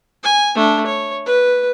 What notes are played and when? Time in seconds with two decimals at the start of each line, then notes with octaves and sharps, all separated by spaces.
0.23 G#5
0.55 A3 D4
0.86 C#5
1.26 B4